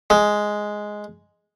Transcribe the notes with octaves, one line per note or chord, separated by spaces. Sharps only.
G#3